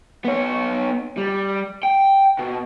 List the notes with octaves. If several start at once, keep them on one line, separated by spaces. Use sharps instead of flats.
B3 C#5
G3
G5
B2